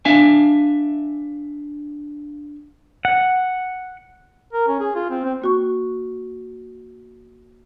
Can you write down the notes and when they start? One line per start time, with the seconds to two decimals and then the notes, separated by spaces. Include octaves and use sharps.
0.05 D4 E5 F5 G#5
3.05 F#5
4.53 A#4
4.68 C#4
4.80 G#4
4.95 F4
5.10 C4
5.25 C4
5.42 A#3 F#4 C#6